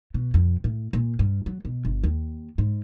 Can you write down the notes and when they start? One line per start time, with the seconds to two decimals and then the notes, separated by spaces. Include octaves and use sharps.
0.14 B2
0.34 F2
0.64 A2
0.93 A#2
1.19 G2
1.46 F#3
1.65 B2
1.85 G1
2.04 D#2
2.58 G#2